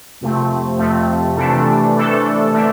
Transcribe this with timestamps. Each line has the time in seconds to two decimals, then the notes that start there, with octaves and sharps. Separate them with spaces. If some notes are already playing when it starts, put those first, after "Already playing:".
0.21 F2 C3 F3 A3 C4
0.78 F2 C3 F3 A3 C4
1.37 C3 E3 A3 D4 A4
1.95 C3 E3 A3 D4 A4
2.52 D3 A3 D4